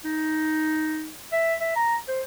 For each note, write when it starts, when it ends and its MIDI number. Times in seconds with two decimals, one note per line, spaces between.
0.05 1.10 63
1.32 1.55 76
1.60 1.75 76
1.76 1.95 82
2.08 2.21 72